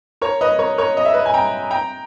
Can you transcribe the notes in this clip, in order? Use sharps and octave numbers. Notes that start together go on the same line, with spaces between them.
A#4 C#5
B4 D#5
A#4 C#5
A#4 C#5
D#5
E5
B4 D#5
G#5
G5 A#5
G5 A#5